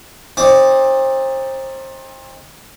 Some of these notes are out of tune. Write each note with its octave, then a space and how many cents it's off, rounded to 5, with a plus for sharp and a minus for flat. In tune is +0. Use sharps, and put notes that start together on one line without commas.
C4 +30 D#4 +0 D5 +0